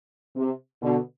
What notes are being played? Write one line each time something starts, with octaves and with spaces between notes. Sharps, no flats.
C3
B2 D3